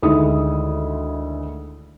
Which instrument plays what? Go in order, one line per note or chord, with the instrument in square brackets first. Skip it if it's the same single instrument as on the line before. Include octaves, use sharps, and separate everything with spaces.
[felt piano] D2 D#3 G#3 D#4 E4 D#6